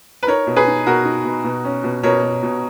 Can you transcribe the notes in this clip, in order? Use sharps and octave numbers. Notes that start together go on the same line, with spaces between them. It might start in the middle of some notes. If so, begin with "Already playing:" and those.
B4
D#4 A#4 C#5
B2
G#4 B4
D#4
B2 F#4 A#4
D#4
B2
B2
C#4
B2
B2 A#4 C#5
B2
B2